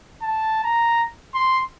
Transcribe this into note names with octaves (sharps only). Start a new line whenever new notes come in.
A5
A#5
C6